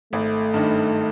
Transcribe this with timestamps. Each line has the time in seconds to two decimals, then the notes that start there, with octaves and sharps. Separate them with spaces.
0.13 G#1 A3
0.54 G2 D#3